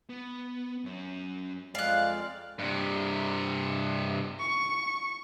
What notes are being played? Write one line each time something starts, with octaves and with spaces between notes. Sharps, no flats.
B3
F#2 C#4
F2 G#3 D5 F5 F6 F#6
G2 C3
C#6